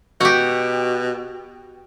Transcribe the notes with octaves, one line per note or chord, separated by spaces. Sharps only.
B2 F#4 G4